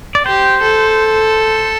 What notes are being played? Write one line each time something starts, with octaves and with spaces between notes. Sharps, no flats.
D5
G4 C5
A4